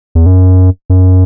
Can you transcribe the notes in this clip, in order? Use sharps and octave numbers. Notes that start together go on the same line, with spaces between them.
E2
F#2
F#2